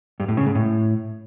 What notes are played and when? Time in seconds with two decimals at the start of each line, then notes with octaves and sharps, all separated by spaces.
0.20 G2
0.28 A2
0.37 C#3
0.46 G#2
0.55 A2